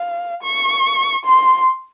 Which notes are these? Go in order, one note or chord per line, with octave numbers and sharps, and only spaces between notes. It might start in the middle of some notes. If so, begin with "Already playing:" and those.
Already playing: F5
C#6
C6